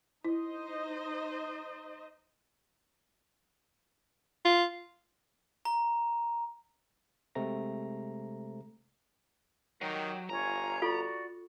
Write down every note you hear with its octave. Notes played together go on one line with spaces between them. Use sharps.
D#4 E4 C5 D#5
F4
A#5
C3 G#3 A3 C4 A#5 A#6
D#3 F#3 G4 D#5 G5
G1 F4 C#5 G#5 A#5
F4 F#4 A4 D5